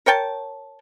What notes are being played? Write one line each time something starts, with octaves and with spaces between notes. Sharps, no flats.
A#4 C#5 G5 A5